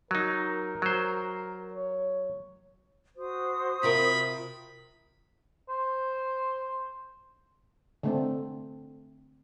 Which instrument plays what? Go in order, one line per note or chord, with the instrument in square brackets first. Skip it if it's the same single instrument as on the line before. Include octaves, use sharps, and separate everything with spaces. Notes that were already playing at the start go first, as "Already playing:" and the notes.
[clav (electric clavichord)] F#3 D#4 [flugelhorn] A#4
[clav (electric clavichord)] F#3 C5
[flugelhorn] C#5
[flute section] F#4 C5 D#6
[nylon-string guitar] C3 F4 A#4 [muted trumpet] B5
[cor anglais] C5
[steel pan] D3 A3 C4